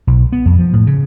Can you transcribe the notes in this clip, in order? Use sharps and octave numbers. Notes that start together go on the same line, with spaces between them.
B1
B3
F2
F3
A2
C#3